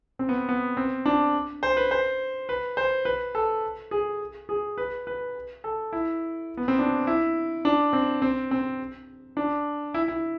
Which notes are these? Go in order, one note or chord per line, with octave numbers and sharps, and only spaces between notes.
C4
B3
B3
C4
D4
C5
B4
C5
B4
C5
B4
A4
G#4
G#4
B4
B4
A4
E4
B3
C4
D4
E4
D4
C4
C4
C4
D4
E4
E4